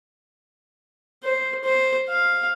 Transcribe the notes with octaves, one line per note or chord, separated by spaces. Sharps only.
C5
C5
F5